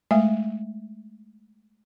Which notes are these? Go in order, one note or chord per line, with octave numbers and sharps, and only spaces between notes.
G#3 A3 E5 G#5